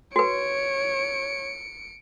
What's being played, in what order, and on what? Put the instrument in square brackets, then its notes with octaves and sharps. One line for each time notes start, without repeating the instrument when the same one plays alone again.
[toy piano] F#4 B4 [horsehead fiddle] C#5 [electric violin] C#7 D7